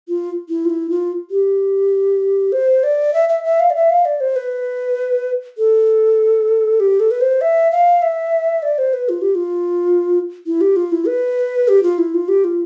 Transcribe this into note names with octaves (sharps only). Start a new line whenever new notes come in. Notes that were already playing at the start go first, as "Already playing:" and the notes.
F4
E4
F4
E4
F4
G4
C5
D5
E5
E5
E5
F5
D5
E5
F5
D5
C5
B4
A4
G4
A4
B4
C5
E5
F5
E5
D5
C5
B4
F4
G4
F4
E4
G4
F4
E4
B4
G4
F4
E4
F4
G4
F4